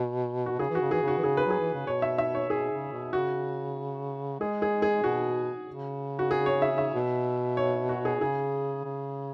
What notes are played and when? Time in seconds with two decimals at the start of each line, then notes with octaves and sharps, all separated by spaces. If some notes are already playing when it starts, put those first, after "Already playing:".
Already playing: B2
0.46 F#4
0.59 C#3 G#4
0.70 E3 F#4
0.81 C#3
0.91 E3 G#4
1.03 C#3 F#4
1.18 E3
1.23 C#3 G#4
1.37 B4
1.46 F#3 G#4
1.59 E3
1.73 C#3
1.87 B2 C#5
2.02 E5
2.18 E5
2.35 C#5
2.50 B2 G#4
2.71 C#3
2.92 B2
3.13 C#3 F#4
4.40 G#3 G#4
4.62 G#4
4.82 G#4
5.03 B2 F#4
5.68 C#3
6.19 F#4
6.31 G#4
6.46 C#5
6.62 E5
6.78 E5
6.94 B2
7.57 C#5
7.89 F#4
8.05 G#4
8.20 C#3 G#4
8.85 C#3